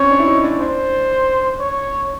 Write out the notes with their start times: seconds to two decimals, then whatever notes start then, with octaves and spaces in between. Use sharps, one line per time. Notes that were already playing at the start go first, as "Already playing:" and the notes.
Already playing: C4 C#4 C#5
0.11 D4
0.19 E4
0.27 D#4
0.44 D4
0.60 D4 C5
1.60 C#5